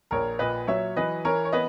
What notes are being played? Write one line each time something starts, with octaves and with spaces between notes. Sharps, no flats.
A#1 A#4 C#5
A#2 B4 D#5
F#3 C#5 E5
E3 B4 D#5
E3 A#4 C#5
C#5
B3 B4 D#5